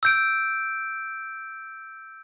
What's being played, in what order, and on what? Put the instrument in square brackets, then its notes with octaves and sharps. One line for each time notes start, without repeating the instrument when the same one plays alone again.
[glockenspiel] E6 G6 D7